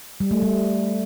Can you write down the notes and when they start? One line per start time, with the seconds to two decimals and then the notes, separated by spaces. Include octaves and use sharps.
0.20 G3
0.31 A3
0.42 G3